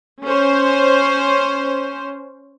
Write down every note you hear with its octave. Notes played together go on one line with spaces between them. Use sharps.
C#4 C5